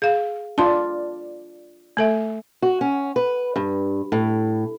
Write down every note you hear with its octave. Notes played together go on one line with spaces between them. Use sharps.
G#4 F5
D4 F4 D5 A5 C6
A3 A4 E5
F#4
C#4
B4
G2
A2